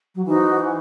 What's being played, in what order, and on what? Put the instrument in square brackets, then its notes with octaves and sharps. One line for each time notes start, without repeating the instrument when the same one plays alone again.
[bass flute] F#3
[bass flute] E3 [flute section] D#4 F#4 C5